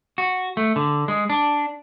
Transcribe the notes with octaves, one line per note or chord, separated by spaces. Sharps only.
F#4
A3
D3
G#3
D4